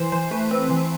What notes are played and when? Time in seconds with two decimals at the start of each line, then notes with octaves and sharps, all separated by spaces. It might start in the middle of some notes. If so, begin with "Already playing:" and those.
Already playing: E3 C5
0.12 E3 C5
0.31 A3 B4
0.51 C4 B4
0.70 E3